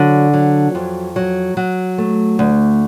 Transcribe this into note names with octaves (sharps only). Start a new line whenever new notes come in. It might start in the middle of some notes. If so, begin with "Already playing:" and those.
Already playing: D3 F#3
F#3
F2
F#3
F#3
A3
D2